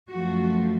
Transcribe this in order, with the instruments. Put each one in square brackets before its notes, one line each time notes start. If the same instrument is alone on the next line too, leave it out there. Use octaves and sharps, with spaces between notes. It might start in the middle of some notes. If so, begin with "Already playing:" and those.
[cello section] F#2 F3 A3 F#4